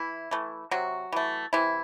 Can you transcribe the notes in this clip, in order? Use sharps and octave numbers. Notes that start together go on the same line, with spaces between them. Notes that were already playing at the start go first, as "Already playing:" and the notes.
Already playing: E3 E4
E3 A3
C3 F#3 F#4
E3 A3
C3 E3 E4